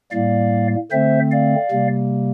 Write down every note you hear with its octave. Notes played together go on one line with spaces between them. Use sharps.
A2 G3 A#3 D5 F5
D3 A3 C4 C5 E5
D5 F5
C3 G3 A#3